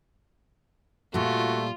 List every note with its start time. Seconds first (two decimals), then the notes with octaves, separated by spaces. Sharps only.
1.14 A#2 G3 A3 F4 F#4